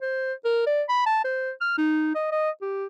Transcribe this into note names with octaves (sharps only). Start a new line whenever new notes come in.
C5
A#4
D5
B5
A5
C5
F6
D#4
D#5
D#5
G4